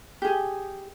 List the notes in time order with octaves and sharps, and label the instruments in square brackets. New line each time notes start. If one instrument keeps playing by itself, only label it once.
[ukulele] G4 G#4